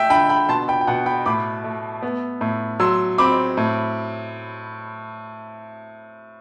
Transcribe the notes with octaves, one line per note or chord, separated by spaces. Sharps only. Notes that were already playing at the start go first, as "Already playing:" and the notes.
Already playing: A3 E5 G5
D3 G5 B5
G5 B5
B2 A5 C6
G5 B5
G5
B2 F#5
G5 B5
A2 B5 D6
A3
B3
A2
F#3 C6 E6
C4 B5 D6
A2